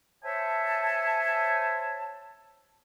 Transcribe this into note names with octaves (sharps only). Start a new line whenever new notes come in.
C5 C#5 E5 G#5 A5